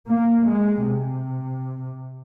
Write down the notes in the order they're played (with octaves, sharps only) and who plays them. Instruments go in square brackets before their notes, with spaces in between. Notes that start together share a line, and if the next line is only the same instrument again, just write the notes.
[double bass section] A#3
G#3
C3